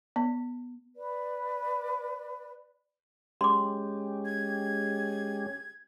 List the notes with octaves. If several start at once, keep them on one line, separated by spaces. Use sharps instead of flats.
B3
B4 D5
G#3 C#4 G4 C6 D6
G#6